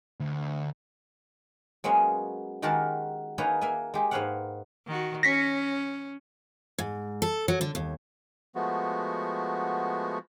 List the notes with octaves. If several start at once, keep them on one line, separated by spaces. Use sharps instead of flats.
D2
F#3 G#3 A#3 B3 C#4
D#3 G#3 F#4 G4 A#4 A5
A#3 D#4 G#4 B4 C#5
A#3 E5 G#5
G#3 G4
G#2 A#3 B4 C#5 F5 F#5
D#3 F#4
C#4 A#6 B6 C#7
G#2
A4
F#3
D3
D#2
F3 G#3 A3 B3 F#4